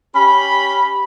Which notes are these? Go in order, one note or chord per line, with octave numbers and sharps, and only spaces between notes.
C#4 G4 B5